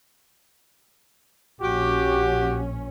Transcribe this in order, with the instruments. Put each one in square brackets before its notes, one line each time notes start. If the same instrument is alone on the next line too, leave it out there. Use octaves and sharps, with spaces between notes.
[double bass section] A#1 C#4 [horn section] F#4 G4